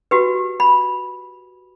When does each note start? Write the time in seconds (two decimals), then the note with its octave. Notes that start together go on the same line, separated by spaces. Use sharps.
0.11 F#4 G4 B4
0.60 B5